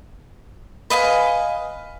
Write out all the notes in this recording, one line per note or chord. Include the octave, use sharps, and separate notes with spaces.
B4 D#5 F5 G#5